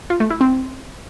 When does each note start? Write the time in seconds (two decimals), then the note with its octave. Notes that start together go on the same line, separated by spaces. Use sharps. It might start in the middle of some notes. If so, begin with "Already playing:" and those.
0.10 F4
0.20 A3
0.30 E4
0.41 C4